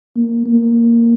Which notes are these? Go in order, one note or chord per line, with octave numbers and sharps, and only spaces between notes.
A#3
A#3